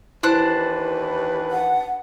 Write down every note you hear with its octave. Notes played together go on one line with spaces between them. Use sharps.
D#2 E3 D4 E4 B4 C5 F#6
F#5